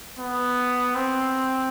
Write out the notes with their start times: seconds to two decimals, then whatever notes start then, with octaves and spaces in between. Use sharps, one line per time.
0.19 B3
0.96 C4